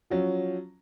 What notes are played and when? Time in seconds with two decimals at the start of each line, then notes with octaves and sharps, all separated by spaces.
0.10 F3 F#3 C#4